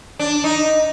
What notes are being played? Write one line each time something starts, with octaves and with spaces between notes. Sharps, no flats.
D4
D#4